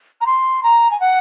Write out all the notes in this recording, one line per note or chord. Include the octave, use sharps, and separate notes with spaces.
A#5
C6
A#5
G#5
F#5